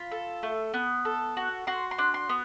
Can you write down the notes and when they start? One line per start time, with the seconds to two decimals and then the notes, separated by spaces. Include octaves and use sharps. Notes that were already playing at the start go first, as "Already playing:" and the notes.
Already playing: F4 B5
0.11 A4
0.43 A3
0.74 B3
1.05 A4
1.37 F#4
1.67 F#4 C6
1.91 C6
1.98 D4
2.14 C6
2.29 B3